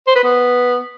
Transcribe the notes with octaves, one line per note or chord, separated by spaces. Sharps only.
C5
B4
B3